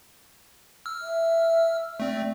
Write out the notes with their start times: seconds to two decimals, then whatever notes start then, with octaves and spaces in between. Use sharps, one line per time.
0.86 E6 F6
1.01 E5
2.00 A3 C4 D5